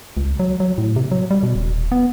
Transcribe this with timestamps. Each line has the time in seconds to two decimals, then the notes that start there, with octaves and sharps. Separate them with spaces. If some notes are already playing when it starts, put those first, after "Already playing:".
0.17 C#2
0.39 F#3
0.60 F#3
0.78 A2
0.96 C3
1.11 F#3
1.31 G3
1.43 B2
1.55 D#1
1.92 B3